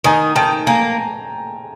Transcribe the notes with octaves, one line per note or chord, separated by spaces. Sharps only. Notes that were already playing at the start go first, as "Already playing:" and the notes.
D#3 G#5 A#5
D#3 G5 A5
A#3 G#5 A#5